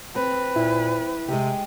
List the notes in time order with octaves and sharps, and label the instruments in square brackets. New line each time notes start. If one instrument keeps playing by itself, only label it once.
[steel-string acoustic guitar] C4 [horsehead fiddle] B4
[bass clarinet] A#2 [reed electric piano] E4
[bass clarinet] C3 [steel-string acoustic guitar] G#3 G4